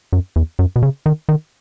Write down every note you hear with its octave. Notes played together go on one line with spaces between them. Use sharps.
F#2
E2
F#2
B2
C#3
D#3
D#3